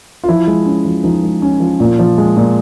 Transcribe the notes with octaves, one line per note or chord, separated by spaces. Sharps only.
F4
F3 E4
G#3
C#4
F3
F3 D#4
G#3
C#4
F3
A#2
F3
G#3
A#2